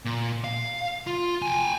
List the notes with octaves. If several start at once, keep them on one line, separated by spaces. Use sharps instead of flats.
A#2
F5
F4
G5 G#5